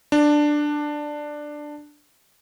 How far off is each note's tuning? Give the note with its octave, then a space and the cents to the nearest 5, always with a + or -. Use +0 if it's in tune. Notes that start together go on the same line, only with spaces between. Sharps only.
D4 +10